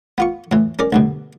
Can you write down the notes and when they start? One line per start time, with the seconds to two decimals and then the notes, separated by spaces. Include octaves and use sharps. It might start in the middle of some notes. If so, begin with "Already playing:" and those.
0.18 B3 F4 C#6
0.52 A2 E3
0.79 C#4 A#4 D5
0.93 D2 G2 B2